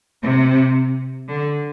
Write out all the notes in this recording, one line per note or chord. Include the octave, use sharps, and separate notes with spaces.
C3
D3